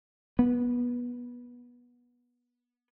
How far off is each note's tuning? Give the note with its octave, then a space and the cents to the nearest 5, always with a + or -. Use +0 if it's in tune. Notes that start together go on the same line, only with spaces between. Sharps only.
B3 -20